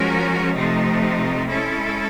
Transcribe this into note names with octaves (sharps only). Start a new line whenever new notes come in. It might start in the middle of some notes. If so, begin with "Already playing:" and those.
Already playing: F3 G#3 C#4 F#4 A#4
C3 F3 A3 C4 D#4
G#3 C#4 E4 A4